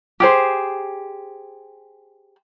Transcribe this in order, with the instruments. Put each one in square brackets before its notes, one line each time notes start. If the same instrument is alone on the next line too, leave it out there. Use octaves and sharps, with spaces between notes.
[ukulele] G4 G#4 C5